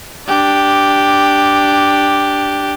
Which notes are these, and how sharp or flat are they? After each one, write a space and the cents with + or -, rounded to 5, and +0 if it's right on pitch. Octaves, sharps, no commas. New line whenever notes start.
D4 +0 G4 +0